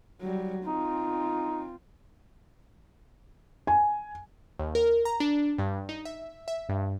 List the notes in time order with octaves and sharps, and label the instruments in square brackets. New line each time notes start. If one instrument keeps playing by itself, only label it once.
[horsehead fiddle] F#3 G3
[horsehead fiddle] C4 F4 [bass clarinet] D#4
[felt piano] G#5
[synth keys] D#2
A#4
A#5
D4
G2
D#4
E5
E5
G2